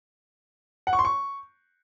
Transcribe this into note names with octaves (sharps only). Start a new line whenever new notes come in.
F#5
C#6
C6
C#6